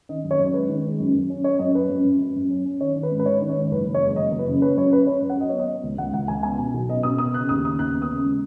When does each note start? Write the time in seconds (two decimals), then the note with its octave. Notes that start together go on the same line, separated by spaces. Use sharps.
0.09 D#3 D#5
0.24 F#2
0.31 C#5
0.39 F#2
0.54 G#3 B4
0.69 D#3
0.85 G#3
1.00 F#2
1.14 F#2
1.30 C#4
1.44 C#4 C#5
1.59 F#2 D#5
1.75 C#4 B4
1.90 F#2
2.05 F#2
2.20 F#2
2.36 F#2
2.50 C#4
2.65 C#4
2.81 D#3 C#5
2.96 D#3
3.03 B4
3.12 G#2
3.19 B4
3.26 D#3 C#5
3.41 D#3
3.49 C#5
3.56 G#2
3.71 F#1 B4
3.87 F#1
3.94 C#5
4.02 G#3
4.16 F#1 D#5
4.31 F#1
4.39 B4
4.46 C#3
4.61 C#4 B4
4.77 F#2 C#5
4.92 C#4 B4
5.07 C#4 C#5
5.22 F#2
5.30 F#5
5.37 F#3 D#5
5.49 B3 C#5
5.59 D#5
5.68 B3
5.83 C#2
5.98 C#2 F#5
6.13 C#2 F#5
6.28 C#2 G#5
6.43 B3 G#5
6.58 B2
6.74 B1
6.89 B3 D#5
7.03 B2 D#6
7.18 B3 D#6
7.34 C#3 F#6
7.49 D#2 D#6
7.65 C#3 D#6
7.79 D#2 F#6
7.95 B3
8.02 D#6
8.10 C#3
8.24 G#3